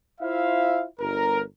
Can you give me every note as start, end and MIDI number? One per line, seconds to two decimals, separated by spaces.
0.21 0.85 64
0.21 0.85 65
0.21 0.85 72
0.21 0.85 76
0.21 0.85 77
0.99 1.42 31
0.99 1.42 70